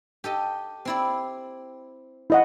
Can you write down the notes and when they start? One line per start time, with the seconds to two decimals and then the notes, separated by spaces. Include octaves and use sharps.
0.24 G4 A4 D#5
0.85 C4 E4 D5
2.30 E4 D#5 F#5